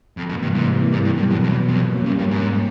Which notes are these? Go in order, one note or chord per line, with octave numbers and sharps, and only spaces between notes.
F2 C3 E3 G3 A#3
F#2
G2
G#2
E2 G#2 B2 F#3
G2
G2
F2
F2
E2
F2 G3 A#3 C#4
F#2
G2
G#2